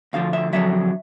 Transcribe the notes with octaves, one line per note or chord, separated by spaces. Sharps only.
D2 D3 F3 F5
E5
F2 D3 F#3 E5